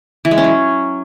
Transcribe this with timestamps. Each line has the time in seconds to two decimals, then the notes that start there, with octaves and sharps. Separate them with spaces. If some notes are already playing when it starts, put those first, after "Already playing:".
0.25 E3
0.31 G#3
0.38 C#4
0.44 F#3